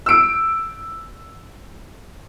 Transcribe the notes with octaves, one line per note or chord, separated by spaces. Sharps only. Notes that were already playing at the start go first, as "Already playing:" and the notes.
E6 D7